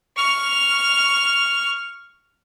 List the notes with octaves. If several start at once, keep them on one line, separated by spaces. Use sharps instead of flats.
C#6 F6